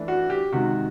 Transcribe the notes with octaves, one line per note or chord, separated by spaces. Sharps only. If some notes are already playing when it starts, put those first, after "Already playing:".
Already playing: E3 A3 D4
F#4
G4
C3 D#3 G#3 F#4